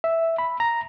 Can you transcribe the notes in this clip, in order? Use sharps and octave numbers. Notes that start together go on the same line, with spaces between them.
E5
B5
A#5